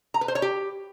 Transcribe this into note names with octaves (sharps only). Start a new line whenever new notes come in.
A#5
B4
C5
C#5
G4